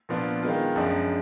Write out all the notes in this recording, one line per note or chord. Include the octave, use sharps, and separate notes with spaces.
A#2 F3 B3 D4 F4
D#3 G#3 B3 F4
F#2 F3 G#3 D4